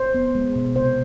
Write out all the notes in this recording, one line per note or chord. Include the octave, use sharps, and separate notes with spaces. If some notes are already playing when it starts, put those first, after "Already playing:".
Already playing: C5
B3
G#3
B2
C3 C5